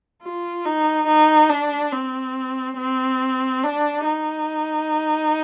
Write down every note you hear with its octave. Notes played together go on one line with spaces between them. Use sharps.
F4
D#4
D#4
D4
C4
C4
D4
D#4